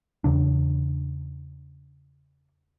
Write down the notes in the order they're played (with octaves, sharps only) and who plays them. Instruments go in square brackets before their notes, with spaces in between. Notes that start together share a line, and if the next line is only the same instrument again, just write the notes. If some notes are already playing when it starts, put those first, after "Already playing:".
[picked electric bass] E2 C#3 D4